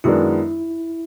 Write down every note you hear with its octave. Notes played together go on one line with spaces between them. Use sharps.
F#2 D#3 G#3 B3 D4 E4